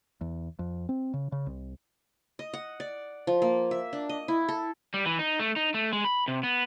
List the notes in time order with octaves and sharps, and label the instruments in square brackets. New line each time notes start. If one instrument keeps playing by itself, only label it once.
[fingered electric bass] E2
F2
C4
C#3
C#3
C2
[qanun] D#5
F#5
D5
F3
A#3
E5
D4
D#5
E4
A4
[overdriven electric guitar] G3
E3
D#4
A3
D#4
A3
G#3
B5
C3
B3